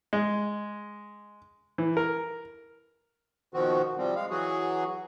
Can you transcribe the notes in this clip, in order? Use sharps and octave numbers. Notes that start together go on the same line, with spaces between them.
G#3
E3
A#4
B2 D#3 F3 C4 F#4
C3 F3 G3 C4
G#3 F5
E3 F#3 F#4 G#4